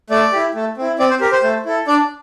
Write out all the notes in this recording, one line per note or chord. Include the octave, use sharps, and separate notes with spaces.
A3 D5
E4 G4
A3
C4 E4
C4 D5
C5
G4 A#4
C5
A3
E4 A4
D4 D5